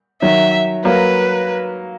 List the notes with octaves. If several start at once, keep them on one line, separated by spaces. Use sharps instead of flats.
D#3 F#3 E5
F#3 A#3 B4